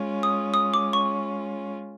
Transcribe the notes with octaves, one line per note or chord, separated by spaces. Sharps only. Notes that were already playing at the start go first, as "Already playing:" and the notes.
Already playing: G#3 C#4 F4
D#6
D#6
D6
C#6